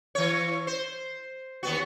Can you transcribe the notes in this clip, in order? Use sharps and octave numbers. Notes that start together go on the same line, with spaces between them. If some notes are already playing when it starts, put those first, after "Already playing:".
E3 C#5
C5
D#2 B3 F#4